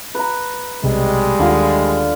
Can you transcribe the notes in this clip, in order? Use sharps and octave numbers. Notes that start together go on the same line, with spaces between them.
B4 A#5
B1 C3 G3 G#3
D#2 D3 F4